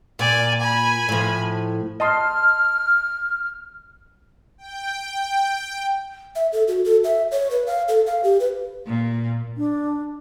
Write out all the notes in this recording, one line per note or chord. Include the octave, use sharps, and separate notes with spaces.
A#2 D5 G#5
G#5 B5
A2 F3
D#5 A5 C6 F6
G5
E5
A4
F#4
A4
E5
C#5
B4
F5
A4
F5
G4
B4
A#2
D4